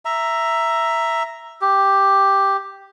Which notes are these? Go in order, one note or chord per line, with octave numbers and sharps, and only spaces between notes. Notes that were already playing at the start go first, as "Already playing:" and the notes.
E5 A#5
G4